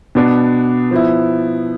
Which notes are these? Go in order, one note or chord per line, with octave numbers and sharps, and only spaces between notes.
B2 B3 D4
F3 B3 E4